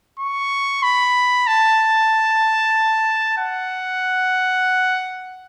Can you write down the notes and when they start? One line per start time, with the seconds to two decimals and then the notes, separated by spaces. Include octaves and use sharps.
0.19 C#6
0.83 B5
1.47 A5
3.38 F#5